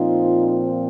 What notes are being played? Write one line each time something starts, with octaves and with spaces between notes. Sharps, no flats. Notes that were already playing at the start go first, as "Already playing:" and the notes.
Already playing: A#2 F3 C4 D#4 F4